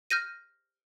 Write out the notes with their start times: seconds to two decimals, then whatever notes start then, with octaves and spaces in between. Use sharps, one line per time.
0.10 F6 G6 A#6 D#7